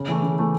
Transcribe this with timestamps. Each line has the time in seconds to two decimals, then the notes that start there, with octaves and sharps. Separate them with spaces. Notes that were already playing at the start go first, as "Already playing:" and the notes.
Already playing: C#3
0.08 E3 A3
0.23 C#3
0.39 E3 A3